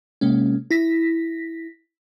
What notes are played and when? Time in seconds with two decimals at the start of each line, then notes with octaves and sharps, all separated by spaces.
0.21 C3 G#3 A#3 C#4
0.71 E4 A#6 B6